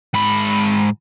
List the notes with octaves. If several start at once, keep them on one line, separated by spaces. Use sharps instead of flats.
G#2 B5